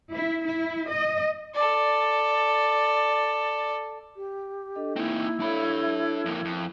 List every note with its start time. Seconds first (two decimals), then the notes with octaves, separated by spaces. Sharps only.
0.12 E4
0.45 E4
0.88 D#5
1.55 A4 D5
4.16 G4
4.76 D4 A4 D#5
4.96 A#3 C4 D#4 E4
5.40 D4 A4 C#5 E5 B5
6.25 F2 A#3
6.45 F2